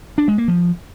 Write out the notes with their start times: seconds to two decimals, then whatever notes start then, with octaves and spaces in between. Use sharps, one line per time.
0.18 D4
0.28 G#3
0.38 A#3
0.48 F3